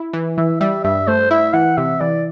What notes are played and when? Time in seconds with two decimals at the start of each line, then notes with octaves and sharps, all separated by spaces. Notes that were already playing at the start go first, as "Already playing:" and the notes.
Already playing: E4
0.13 E3
0.37 E3 E5
0.60 G3 E5
0.84 G2 E5
1.08 A3 C5
1.30 E4 E5
1.53 E3 F#5
1.77 C3 E5
2.00 E3 D5